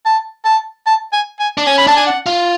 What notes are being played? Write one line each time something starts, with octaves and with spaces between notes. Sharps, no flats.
A5
A5
A5
G#5
G#5
D4
C#4 G#5
B5
D4 A5
G#5
F#5
F4